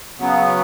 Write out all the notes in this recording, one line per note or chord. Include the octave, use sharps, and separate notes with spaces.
C#3 F#3 B3